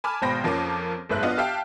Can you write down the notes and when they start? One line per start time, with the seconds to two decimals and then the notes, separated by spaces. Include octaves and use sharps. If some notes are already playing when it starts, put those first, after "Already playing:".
0.04 G#5 A5 B5 D6 F6
0.22 G#1 B2 C5 G5 B5 A#6
0.44 F2 F3 A#3 C#4 D6
1.09 F#1 B1 G#2 B4 E5 F#6
1.23 B3 D4 F4 D#5
1.38 G4 E5 F5 G5 A5